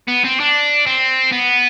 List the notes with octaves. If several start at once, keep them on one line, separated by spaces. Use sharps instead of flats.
B3
C4
D4
C4
B3